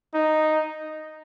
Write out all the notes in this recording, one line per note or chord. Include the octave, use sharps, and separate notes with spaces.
D#4